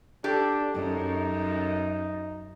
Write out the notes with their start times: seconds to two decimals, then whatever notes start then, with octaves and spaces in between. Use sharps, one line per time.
0.24 D4 G4 A4
0.74 F#2 D#4